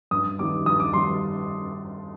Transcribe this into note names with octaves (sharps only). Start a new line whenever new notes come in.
G2 D#6
D#3 G3 B3 D6
G2 D#6
D6
D#3 G3 B3 C6